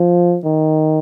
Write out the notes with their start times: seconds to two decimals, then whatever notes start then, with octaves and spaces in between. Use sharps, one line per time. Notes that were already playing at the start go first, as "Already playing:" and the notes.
Already playing: F3
0.44 D#3